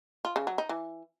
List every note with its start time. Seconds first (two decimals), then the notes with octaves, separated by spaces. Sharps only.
0.25 F4
0.36 C#3
0.47 F#3
0.58 D#4
0.69 E3